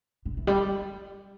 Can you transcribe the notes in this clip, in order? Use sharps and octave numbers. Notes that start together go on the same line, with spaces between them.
D3
E3
G3